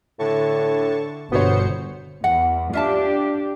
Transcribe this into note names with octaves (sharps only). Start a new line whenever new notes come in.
A2 D3 A5 C#6
G1 B2 B3 F#4 C5 C#5 C#7
E2 F#5
D4 F4 G4 E5 A5